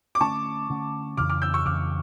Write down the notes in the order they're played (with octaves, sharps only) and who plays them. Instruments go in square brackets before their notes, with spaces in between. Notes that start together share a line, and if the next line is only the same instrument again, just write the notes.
[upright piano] D6
[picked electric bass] D3 A3 C#4 [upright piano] A5 C#6
[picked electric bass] D3 A3 C#4
[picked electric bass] F2 C#3 E3 [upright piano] D6 F6
[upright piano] D6 F6
E6 G6
C#6 E6
[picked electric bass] F2 C#3 E3 [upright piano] D6 F6